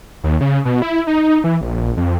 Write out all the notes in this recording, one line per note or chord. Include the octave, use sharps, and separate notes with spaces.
D#2
C#3
B2
E4
D#4
E3
A#1
A#1
F2